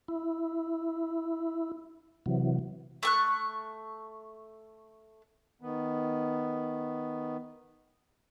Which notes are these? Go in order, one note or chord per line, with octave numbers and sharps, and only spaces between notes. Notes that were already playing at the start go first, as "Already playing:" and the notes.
E4
C3 E3 F#3
A3 C#6 F#6
D#3 B3